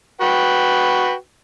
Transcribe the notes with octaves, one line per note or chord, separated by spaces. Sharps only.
F#4 B4 G5